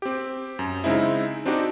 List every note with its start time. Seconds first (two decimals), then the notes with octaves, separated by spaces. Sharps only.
0.02 C4 G4
0.59 F#2
0.84 C#3 G#3 C4 D#4 E4
1.46 C4 D4 D#4 F#4 G4